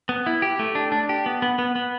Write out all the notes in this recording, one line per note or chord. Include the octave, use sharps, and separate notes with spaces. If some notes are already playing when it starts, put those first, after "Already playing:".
B3
E4
G4
A3
D4
D4
G4
B3
B3
B3
B3